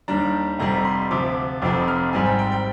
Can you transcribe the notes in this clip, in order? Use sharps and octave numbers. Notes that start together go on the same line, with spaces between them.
D#2 D#3 G3 D4 A#5
F1 F2 C3 G3 A#5
C6
D2 C3 F3 D6
F1 F2 C3 F3 C4 D6
F6
G#1 G#2 G3 C4 G#5
G5
G5
G5